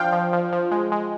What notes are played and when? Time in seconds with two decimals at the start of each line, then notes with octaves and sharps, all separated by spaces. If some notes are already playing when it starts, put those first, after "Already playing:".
Already playing: F3 D4 F5 G5
0.13 F3
0.33 F3
0.53 F3
0.71 G#3
0.92 G#3